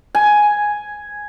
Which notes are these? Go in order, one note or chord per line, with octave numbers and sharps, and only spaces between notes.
G#5